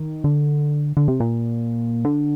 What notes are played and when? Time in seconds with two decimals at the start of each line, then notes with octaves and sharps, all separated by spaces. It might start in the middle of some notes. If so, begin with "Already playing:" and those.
Already playing: D#3
0.24 D3
0.97 D3
1.08 C3
1.20 A#2
2.05 D3